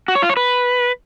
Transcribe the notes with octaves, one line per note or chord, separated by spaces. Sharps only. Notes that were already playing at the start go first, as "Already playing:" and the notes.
F#4
C#5
F4
C#5
B4